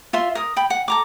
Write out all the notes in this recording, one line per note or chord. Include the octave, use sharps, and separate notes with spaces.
F4 E5 C6
A#4 D#6
G5 B5
F#5
A4 A#5 D6